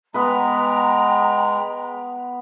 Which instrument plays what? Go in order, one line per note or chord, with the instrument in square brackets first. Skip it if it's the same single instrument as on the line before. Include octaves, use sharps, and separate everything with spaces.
[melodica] G#3 [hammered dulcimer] B3 B4 [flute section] G5 A#5